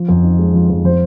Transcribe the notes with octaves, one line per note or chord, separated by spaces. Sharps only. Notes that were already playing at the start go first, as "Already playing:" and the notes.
Already playing: F3
F2
D#4
G#3
F3
F2
F3 C5